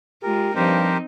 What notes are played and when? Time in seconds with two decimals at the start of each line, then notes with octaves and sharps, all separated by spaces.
0.23 G#3 F4 G4 A#4
0.55 G2 F3 C4 D#4 G4 A#4 C5